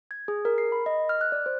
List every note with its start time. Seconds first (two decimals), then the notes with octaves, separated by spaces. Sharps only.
0.11 G#6
0.28 G#4
0.45 A#4
0.58 C7
0.72 B5
0.86 D#5
1.09 F6
1.21 F#6
1.32 D5
1.46 C5